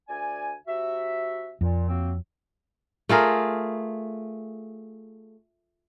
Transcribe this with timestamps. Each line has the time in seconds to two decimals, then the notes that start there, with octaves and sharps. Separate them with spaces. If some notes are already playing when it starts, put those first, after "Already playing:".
0.09 D2 D5 G#5
0.68 C3 F#4 E5
1.61 F2 A#2
1.89 F#3 A#3 C4
3.09 A3 F4 G#4 A#4